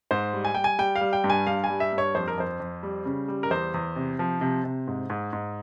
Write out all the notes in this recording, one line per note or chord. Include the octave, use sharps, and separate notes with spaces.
G#2 C5
G3
G#5
G3 G5
G#5
G3 G5
F5
G3
G5
G2
G#5
G2 F5
G#5
G3
E5
G2
C#5
F2 C5
A#4
F2 C5
F2
G3
C#3
G3
A#4
E2 C5
E2
C3
F3
C3
C3
G#2
G#2
G#2